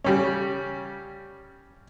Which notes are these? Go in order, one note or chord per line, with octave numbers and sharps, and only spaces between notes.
C#3 G3 C#4